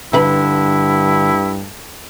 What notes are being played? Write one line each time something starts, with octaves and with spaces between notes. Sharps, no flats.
G2 D3 D#4 E4 B4 B5